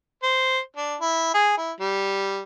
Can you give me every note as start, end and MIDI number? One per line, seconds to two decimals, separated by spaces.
0.23 0.59 72
0.76 0.96 62
1.01 1.34 64
1.34 1.55 68
1.57 1.72 64
1.80 2.43 55